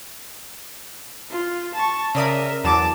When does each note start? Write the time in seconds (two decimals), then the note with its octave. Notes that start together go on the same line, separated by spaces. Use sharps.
1.31 F4
1.74 A5 C#6
2.15 C#3 A#4 D5 E5 D#6
2.64 E2 F#3 A5 D6 E7